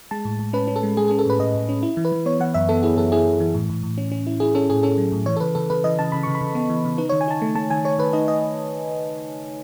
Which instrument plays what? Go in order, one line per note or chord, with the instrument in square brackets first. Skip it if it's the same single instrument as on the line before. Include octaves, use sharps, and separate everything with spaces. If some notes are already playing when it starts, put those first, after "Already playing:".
[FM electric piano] G#3 A5
A2
A2
C#4 B4
C#4
A4
G#3
G#3 G#4
G#4
C#4
A4
A2 B4
A2 D#5
A2
C#4
E4
E3
B4
E3
B3 C#5
E3 F#5
F#2 E5
B3 A4
E4 G#4
F#2 A4
E4 G#4
F#2
E3
A2
A2
A2
C#4
C#4
E4
E4 G#4
C#4 A4
A2 G#4
C#4 A4
F#3
A2
E3 C#5
A4
C#3 B4
C#3 A4
C#3 B4
E3 D#5
C#3 A5
C#3 B5
C#6
C#3
B5
C#3
B3
E3
C#3
D#4 B4
C#5
D#3
G#5
D#4 A5
A3
A3 A5
D#3 G#5
A3 C#5
D#3 B4
D#4 D#5
D#5